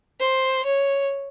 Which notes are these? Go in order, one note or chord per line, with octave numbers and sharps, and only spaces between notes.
C5
C#5